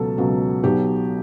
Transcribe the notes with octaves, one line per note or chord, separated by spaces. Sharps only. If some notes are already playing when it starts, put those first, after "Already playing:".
Already playing: C#2 B2 F#3 A4
C#2 B2 F#3
B1 B2 F#3 G4